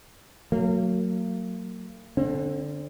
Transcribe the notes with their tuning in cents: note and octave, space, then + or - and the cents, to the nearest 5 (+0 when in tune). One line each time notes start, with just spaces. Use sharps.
F#3 +0 A#3 -35
D3 +0 C4 +30